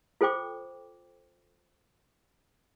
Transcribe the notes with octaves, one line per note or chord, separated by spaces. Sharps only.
F4 A4 C5 G5 D6